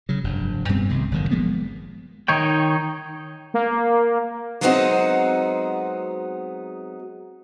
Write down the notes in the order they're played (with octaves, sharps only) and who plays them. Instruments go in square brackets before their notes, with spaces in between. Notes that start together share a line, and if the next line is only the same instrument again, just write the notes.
[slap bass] C#3 F#3
F1 G2
G2 G3 B3 C4
B1 C3 D#3 G#3
F#1 A2 D#3
F3 G#3 A#3 B3
[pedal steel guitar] D#3 D#4 C#5 G5
[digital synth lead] A#3
[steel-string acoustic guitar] F#3 G#3 B3 C4 D#4 F#4